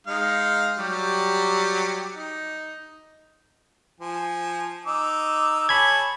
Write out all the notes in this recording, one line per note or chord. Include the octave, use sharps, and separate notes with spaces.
G#3 D#4 F5
F#3 G3 G4
D#4
F3 G#5
D#4 D6 E6
G#4 C#5 A5 B5 G#6